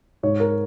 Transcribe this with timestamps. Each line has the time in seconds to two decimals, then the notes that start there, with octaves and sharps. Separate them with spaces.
0.23 G#2 C#5
0.40 A#4